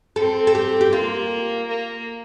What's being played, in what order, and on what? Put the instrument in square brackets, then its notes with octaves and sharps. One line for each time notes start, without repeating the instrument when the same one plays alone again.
[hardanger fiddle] C4 [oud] A4
[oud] A4
G4
G4
[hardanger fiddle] A#3 [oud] F4
[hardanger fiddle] A#3